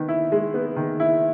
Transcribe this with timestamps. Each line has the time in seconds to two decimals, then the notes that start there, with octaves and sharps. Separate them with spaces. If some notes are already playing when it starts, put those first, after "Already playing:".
Already playing: D#3 B3
0.09 E4
0.32 G#3
0.54 B3
0.76 D#3
1.00 E4